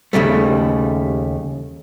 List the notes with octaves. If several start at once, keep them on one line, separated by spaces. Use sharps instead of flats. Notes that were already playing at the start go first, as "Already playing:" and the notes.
D#2 C#3 G3 A3